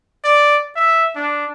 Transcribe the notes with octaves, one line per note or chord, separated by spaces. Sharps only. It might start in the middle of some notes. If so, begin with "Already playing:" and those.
D5
E5
D4